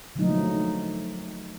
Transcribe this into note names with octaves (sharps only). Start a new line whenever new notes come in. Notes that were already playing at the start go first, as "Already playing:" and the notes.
D3 F3 F#3 A3 A#3 D#4